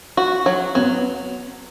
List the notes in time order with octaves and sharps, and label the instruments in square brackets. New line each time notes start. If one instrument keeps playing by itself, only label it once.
[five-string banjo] F#4
F#3
[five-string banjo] F#3 [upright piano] B3